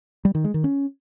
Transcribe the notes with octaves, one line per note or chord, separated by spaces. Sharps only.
G3
D#3
G#3
D#3
C#4